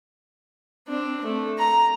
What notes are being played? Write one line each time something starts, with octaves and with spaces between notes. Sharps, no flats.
C4 D4
A3
A#5